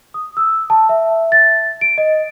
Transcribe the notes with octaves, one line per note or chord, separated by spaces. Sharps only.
D#6
E6
A5
E5
A6
D7
D#5